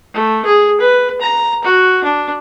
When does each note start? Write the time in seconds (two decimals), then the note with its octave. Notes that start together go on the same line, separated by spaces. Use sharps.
0.14 A3
0.45 G#4
0.80 B4
1.21 A#5
1.64 F#4
2.03 D4